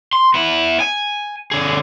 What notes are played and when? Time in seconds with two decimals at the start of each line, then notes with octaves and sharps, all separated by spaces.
0.13 C6
0.34 B3 E4
0.80 G#5
1.51 D3 G#4